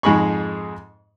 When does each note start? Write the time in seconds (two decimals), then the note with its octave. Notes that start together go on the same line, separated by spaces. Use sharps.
0.03 F2 G#2 G#3 G#4 B5 C#6